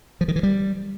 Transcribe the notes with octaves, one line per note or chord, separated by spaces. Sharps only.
F3
D#3
E3
G3